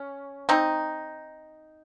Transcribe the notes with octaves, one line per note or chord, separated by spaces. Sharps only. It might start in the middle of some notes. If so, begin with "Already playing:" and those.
Already playing: C#4
C4 D#4